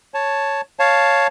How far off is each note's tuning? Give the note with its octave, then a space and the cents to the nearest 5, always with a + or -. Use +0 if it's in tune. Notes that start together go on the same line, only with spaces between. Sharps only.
C#5 +0 A5 +0
C#5 +5 F5 +0 A5 +0